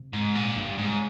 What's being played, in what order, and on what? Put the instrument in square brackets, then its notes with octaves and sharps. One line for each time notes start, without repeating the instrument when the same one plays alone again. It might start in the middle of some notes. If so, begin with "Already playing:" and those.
Already playing: [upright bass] C3
[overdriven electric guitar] G#2
A#2
[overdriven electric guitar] G2 [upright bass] D#3
[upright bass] C#3
[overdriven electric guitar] G#2 [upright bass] C3
[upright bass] C#3